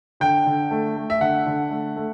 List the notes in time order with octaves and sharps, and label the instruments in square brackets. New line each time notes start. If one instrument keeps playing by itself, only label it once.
[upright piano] D3 G5
D3
A3
A3
E5
D3 F#5
D3
A3
A3